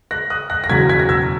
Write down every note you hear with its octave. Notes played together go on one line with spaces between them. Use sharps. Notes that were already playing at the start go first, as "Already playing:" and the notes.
F#6 A#6
D#6 F#6
F#6 A#6
A#6
F#1 E2 B2 F#3 G#6 B6
G#6 B6
A#6
E6 G#6